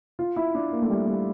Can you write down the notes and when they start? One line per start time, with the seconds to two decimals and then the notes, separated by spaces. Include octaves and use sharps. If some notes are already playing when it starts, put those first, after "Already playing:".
0.19 F4
0.36 E4
0.55 D4
0.72 A#3
0.82 A3
0.90 G3
1.07 G3